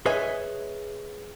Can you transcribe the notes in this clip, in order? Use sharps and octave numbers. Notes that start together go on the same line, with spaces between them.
G#4 B4 C#5 D#5 E5 G#5